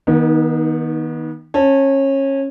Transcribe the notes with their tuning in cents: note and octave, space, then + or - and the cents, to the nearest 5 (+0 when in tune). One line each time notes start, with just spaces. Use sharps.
D#3 +20 B3 -30 D#4 +0
C#4 -25 A5 +0